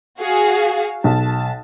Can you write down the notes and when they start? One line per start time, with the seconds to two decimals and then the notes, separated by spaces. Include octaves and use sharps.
0.19 F#4 G#4 F5
1.04 B1 A5